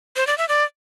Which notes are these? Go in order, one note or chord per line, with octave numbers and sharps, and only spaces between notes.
C5
D5
E5
D5